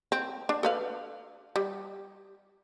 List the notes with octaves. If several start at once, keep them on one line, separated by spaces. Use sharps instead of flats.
C4
D4
A4 B4 F5
G3